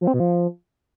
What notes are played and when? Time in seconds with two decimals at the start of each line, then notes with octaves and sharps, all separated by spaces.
0.01 F3
0.07 C4
0.14 B2
0.20 F3